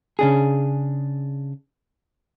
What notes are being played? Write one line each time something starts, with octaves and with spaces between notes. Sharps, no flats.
C#3 D4 G#4